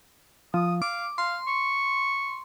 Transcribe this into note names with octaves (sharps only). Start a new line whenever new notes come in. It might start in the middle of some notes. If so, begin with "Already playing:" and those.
F3 D#6
F5 D6
F5 C6
C#6